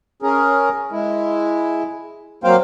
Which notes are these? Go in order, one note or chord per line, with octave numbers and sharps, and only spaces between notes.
C#4 G#4 A#4
G#3 E4
F#3 A#3 C4 C5 F5 G5